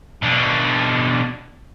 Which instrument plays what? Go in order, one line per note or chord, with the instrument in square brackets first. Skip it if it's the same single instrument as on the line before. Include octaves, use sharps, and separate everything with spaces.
[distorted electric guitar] B2 D4